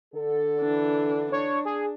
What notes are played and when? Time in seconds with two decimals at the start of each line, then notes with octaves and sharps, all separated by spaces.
0.15 D3 A4
0.60 E3 D4
1.32 D4 C#5
1.65 G#4